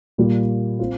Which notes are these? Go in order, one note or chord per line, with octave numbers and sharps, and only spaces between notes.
A#2 G3 A#3 F4
C4 F4